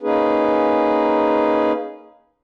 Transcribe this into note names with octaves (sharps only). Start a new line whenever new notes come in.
A#3 C#4 D#4 G#4 B4